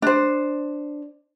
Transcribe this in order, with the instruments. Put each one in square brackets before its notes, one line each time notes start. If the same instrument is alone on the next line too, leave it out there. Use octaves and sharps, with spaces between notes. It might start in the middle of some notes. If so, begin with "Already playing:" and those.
[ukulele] D4 C5